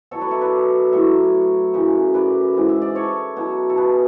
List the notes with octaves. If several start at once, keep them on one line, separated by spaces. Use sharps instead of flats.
B2 F#3 A4 C#5
B4 D5
C#5 E5
B4 D5
A2 F#3 C#5 E5
F#2 C#3 E3
B4 D5
G#2 E3
E5
D5
A4 C#5
B2 F#3
A4
G#4 B4